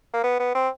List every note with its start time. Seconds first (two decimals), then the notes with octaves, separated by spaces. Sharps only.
0.13 A#3
0.23 B3
0.39 B3
0.55 C4